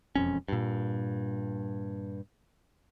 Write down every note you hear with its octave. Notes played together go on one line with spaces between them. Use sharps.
E1 F2 C#4
G2 A#2